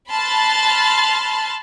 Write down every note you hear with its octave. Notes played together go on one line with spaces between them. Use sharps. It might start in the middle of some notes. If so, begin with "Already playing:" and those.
A5 B5 C6 F6 F#6 A6